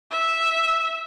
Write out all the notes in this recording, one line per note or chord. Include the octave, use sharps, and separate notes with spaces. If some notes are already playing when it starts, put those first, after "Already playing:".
E5